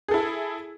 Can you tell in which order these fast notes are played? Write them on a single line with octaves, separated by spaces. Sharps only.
G#4 A4 E4